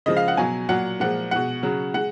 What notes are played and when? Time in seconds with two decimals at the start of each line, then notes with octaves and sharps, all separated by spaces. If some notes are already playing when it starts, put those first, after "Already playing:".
0.06 C#3 F3 G#3 D#5
0.17 F5
0.28 F#5
0.37 B2 F#3 G#5
0.69 A#2 F#3 F#5
1.00 A#2 F3 G#3 F#5
1.31 B2 G#3 F#5
1.63 C#3 F#3
1.94 G#3 F#5